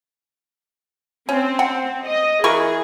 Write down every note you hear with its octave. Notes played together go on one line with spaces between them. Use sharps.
C4 C#4
F#5 G5
D#5
E3 G#4 A#4 C#6